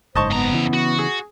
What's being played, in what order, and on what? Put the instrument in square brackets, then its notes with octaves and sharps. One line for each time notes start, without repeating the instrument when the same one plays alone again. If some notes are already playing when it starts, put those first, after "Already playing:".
[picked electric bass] F#1 G#2 [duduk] C5 [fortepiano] D#5 A5 C#6
[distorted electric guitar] F2 A#5 [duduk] B3
[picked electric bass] C#3 E3
[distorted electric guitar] F#4
[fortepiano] G#4